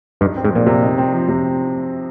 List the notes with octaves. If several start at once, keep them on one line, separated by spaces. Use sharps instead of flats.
G2 D#4
C4
G#2
A#2 F3
C3
D#4
C4
F3
C3